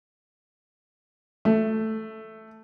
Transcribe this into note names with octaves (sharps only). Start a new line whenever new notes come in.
A3